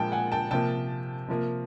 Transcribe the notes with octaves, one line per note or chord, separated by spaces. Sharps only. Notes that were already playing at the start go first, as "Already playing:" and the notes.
Already playing: A#2 F3 G#3 G5 A5
F#5 G#5
G5 A5
C3 F3 A#3 G5 A5
C3 F3 A#3